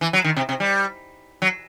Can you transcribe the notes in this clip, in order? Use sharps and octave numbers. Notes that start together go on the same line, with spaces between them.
E3
F#3
D#3
C3
C3
G3
F#3